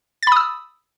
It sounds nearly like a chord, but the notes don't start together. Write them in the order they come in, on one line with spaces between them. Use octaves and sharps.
A6 B5 D#6 E6